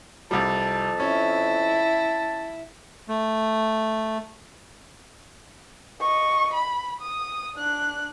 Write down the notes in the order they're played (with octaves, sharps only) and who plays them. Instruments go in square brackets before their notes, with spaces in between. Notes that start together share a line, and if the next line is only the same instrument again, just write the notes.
[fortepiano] C2 G3 [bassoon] F2 [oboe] A5
[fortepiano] C#4 [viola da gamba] E4
[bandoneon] A3
[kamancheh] D#5 C#6
B5
D#6
D4 F#6